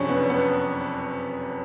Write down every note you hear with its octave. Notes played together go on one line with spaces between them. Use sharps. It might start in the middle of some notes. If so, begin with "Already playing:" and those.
Already playing: F#1 F2 C3 C#4 D4
B3
B3